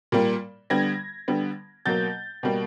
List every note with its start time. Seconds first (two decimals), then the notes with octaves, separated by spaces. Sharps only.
0.12 A#2 G3 A#3
0.70 D3 G3 B3 G#6 A#6
1.28 D3 G3 B3
1.86 B2 F#3 A#3 G6 A6
2.43 B2 G3 A#3